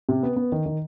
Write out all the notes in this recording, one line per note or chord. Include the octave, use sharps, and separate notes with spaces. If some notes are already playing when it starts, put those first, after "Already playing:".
C3
B3
B3
D#3
D#3